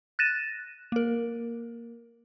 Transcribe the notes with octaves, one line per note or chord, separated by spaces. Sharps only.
F#6 A6 A#6 D#7 E7
A#3 A#4